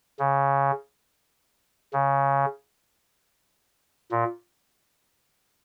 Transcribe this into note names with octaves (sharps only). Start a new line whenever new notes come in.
C#3
C#3
A#2